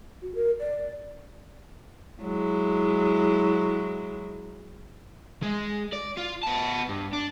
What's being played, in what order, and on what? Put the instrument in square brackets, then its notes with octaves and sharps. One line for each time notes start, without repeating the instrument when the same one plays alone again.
[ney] F#4
A#4
D5
[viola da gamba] F#3 G#3 E4
[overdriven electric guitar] G#3
D5
F4
B3 A5
G2
D4